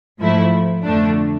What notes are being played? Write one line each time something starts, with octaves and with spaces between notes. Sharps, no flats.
G#2 F3 A3 E4
F2 D3 A3 D4